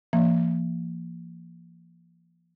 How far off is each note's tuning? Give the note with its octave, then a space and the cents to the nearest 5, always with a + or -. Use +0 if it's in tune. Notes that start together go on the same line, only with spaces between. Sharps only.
F3 -45 A#3 +0